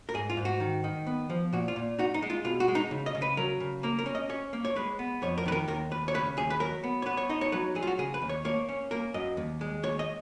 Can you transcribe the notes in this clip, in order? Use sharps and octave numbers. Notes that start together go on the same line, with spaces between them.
A#4
G#2 G#4
F4
G#2
F#4
D#3
D#3
B3
F3
A#2 F#4
F4
A#2
D#4 F#4
D#4
G#3
F4
B2 F4
F#4
G#3
D#4
C#3
D#5
C#3
B4
F#3 A#4
C#3
A#3 A#4
A#4
C#4
D#5
C#4 C#5
A#3
C#5
G#3 B4
B3
F2 C#5
A#4
D#3 B4
A#4
D#2 A#4
D#2 B4
C#5
C#3 B4
D#2 G#4
B4
F#3 A#4
B3
C#5
B3 B4
C#5
D#4 D#5
C#5
F#3 B4
F#3 G#4
F4
F#4
C#3 G#4
B4
D#2
C#5
A#3 C#5
C#4
A#3 A#4
F#2 D#5
D#2
G#3
D#2 C#5
D#5